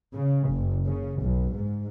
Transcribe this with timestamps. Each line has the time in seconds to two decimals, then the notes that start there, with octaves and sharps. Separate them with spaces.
0.13 C#3
0.50 F#1
0.86 C#3
1.21 B1
1.54 G#2